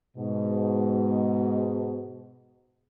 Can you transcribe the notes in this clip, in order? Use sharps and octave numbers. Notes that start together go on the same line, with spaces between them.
G#2 B2